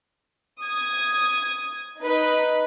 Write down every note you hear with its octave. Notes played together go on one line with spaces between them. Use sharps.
D#6 G#6
D#4 B4